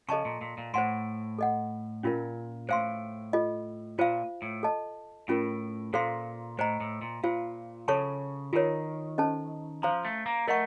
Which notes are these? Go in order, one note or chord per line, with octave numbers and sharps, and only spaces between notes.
C#3 A4 D#5 A5 C#6
A#2
A#2
A#2
A2 C5 F#5 C6
A4 D#5 F#5
A#2 C#4 F4 A#4
A2 C5 F5 C6
F4 A4 D#5
A#2 F4 C5 F5
A2
A4 D#5 A5
A2 C#4 F4 A#4
A#2 A4 C5 F5 C6
A2 C5 D#5 A#5
A2
A#2
A#2 F4 C5 F5
C#3 A4 C#5 A5 C#6
D#3 F4 A#4 C#5
C#4 A4 C5 D#5 A5
F3 C5 F5 A#5
A3
A#3
A3 A#4 D#5 F#5 A#5 C#6